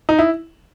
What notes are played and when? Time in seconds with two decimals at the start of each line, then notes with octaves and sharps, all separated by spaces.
0.09 D#4
0.19 E4